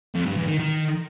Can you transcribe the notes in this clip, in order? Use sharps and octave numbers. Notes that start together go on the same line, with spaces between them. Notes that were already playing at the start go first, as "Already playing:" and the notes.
F2
G2
E2
D#3
D#3